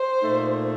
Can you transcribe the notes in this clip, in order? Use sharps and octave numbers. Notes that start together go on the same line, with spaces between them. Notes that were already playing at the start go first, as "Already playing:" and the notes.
Already playing: C5
A#2 A3 D#4